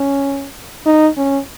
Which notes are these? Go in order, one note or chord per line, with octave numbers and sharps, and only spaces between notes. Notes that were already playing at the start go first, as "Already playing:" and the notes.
Already playing: C#4
D#4
C#4